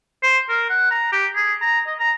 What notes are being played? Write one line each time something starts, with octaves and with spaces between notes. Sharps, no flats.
C5
A#4
F#5
A#5
G4
G#4
A#5
D#5
A#5